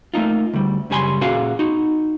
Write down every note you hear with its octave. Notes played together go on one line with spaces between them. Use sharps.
A3 A#3 D#4 F4
D2 G3
F#2 C#3 G3 G#5 B5 C6
A#2 C#4 F#4 G#4 F5
D#4 F#4